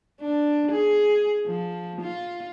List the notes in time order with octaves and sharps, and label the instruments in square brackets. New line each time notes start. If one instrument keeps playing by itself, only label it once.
[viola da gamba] D4
G#4
F3
F4